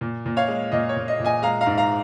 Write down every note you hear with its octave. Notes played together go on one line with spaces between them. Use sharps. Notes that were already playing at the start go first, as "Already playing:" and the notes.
A#2
A#2
C#5 F5
G#3
A#2 D#5
C#5
A#2
D#5
A#2
D#5 G#5
G#3 F5 A#5
F5 A#5
G#2
F5 A#5